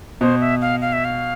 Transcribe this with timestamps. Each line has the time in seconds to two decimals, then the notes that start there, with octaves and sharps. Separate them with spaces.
0.21 B2 C5
0.41 E5
0.61 F5
0.82 F5
0.93 E5
1.05 F5